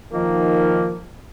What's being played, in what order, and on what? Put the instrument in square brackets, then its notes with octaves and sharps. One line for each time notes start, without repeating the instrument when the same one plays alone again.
[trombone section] D#3 F3 A#3 D#4